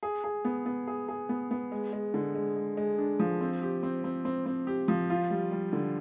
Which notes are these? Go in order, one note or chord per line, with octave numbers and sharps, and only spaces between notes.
G#4
G#4
B3
B3
G#4
G#4
B3
B3
G#3
G#3
D3
G#3
G#3
G#3
D4
F3
C4
G4
C4
C4
C4
C4
G4
F3
F4
G3
G3
D3